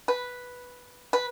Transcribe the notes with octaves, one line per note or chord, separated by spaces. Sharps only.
B4
B4